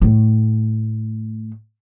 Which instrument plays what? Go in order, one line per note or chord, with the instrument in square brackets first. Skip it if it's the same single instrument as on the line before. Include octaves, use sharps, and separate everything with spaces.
[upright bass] A2 A3